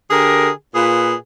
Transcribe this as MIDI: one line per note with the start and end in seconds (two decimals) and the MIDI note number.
0.10 0.50 50
0.10 0.50 67
0.10 0.50 68
0.10 0.50 70
0.75 1.14 46
0.75 1.14 65
0.75 1.14 68
0.75 1.14 71